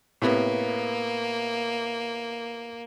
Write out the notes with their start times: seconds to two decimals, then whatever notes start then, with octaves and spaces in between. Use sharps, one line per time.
0.22 A2 C3 A#3 B3